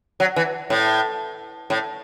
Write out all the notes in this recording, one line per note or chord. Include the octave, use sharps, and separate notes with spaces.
F#3
E3
A2
A2